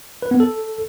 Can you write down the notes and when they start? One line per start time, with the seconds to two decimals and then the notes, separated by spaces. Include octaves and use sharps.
0.22 B4
0.31 B3
0.40 A4